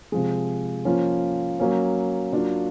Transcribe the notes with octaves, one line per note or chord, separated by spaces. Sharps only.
C3 F3 G#3
F3 A#3 C#4 F4
F#3 A#3 C#4
F#3 A#3 D4 F4